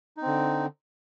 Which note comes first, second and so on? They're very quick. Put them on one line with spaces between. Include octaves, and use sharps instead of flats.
D#4 C4 D3